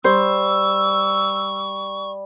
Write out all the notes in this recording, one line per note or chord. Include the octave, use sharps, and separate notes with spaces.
G3 C5 C#6 E6